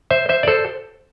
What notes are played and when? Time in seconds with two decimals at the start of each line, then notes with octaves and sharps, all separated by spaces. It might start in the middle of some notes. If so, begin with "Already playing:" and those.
0.10 C5 E5
0.29 C5 E5
0.43 D5
0.48 A4 C5